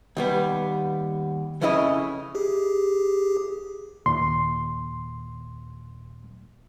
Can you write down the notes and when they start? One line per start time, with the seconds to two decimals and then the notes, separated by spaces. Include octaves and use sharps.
0.17 D#2 G3 B3
1.61 F2 C#3 C#4 E4 G#4 D#5
2.35 G4 G#4
4.06 D#2 A#2 C6